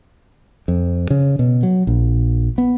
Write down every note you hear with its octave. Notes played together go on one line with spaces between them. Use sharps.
F2
C#3
B2
F#3
A#1
B3